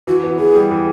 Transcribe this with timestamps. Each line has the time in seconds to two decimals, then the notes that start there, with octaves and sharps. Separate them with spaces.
0.07 E3 F#4
0.24 B3
0.38 E3 G#4
0.55 G3
0.71 E3